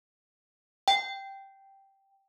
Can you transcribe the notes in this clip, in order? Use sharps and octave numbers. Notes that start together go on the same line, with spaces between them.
G5